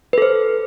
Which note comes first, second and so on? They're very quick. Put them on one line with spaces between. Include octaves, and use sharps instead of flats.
B4 A4 C5